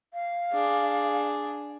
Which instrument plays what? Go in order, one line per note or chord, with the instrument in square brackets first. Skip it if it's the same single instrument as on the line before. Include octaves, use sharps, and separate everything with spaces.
[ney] F5
[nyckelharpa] D4 G#4